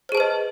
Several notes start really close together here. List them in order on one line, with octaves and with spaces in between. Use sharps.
C5 G#4 A5 B4 D#5